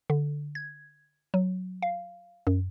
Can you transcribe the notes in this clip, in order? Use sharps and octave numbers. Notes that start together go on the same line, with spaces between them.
D3
G#6
F#3
F5
F#2